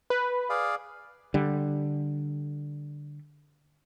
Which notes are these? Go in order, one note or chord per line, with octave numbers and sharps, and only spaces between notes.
B4
G#4 D5 F5
D3 G3